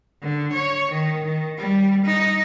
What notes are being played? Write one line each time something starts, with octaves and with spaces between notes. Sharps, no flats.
D3
C#5
D#3
D#3
G3
D#4